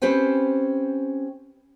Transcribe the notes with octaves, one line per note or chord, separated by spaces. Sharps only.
C4 C#4 G4 B4 C5 G#5